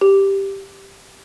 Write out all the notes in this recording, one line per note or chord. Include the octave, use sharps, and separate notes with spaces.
G4